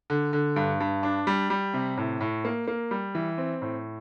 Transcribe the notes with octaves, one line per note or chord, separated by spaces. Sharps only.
D3
D3
G2
G2
D4
G3
G3
C3
A2
A2
A#3
A#3
G3
E3
C4
A2